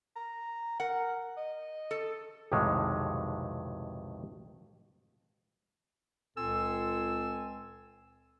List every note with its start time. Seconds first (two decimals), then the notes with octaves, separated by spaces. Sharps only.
0.16 A#5
0.80 A#4 F#5
1.37 D#5
1.91 A4
2.52 B1 F2 A2 C3 D#3 G#3
6.36 C#2 A#2 C4 A4 G#5 E6